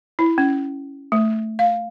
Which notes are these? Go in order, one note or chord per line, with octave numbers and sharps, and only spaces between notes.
E4
C#4
A3
F5